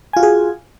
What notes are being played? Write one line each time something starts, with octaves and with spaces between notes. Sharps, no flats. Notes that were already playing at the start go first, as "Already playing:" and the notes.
F4 F#4 G#4 G#5